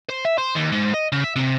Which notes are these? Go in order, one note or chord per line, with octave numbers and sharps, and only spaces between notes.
C5
E5
C5
D#2
G#2
D#5
C#3
E5
C3